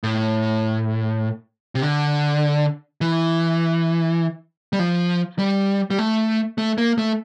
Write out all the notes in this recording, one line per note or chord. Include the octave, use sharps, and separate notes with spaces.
A2
C3
D3
E3
G3
F3
G3
G3
A3
A3
A#3
A3